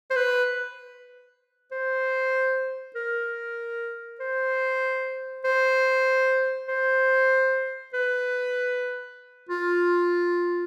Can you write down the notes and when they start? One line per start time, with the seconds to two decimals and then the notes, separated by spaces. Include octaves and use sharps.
0.10 C5
0.16 B4
1.72 C5
2.95 A#4
4.20 C5
5.45 C5
6.69 C5
7.94 B4
9.49 F4